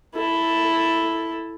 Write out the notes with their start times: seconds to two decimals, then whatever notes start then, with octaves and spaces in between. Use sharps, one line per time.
0.15 E4 A4